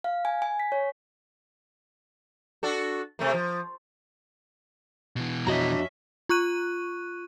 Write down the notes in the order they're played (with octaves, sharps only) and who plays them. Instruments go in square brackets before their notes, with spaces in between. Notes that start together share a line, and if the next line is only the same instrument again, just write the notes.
[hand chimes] F5
G#5
G#5
B6
C#5
[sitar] D4 F#4 A4
C3 A3 A#3
F3
[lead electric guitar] B2 E3
[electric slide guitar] F2 F#4 D#5 [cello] C#4 E5 [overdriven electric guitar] D4 A#5
[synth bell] F4 C#6 F#6 D#7